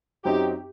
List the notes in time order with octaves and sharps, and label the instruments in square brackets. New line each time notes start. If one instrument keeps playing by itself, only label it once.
[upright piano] F#2 F#3 C4 D#4 [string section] G4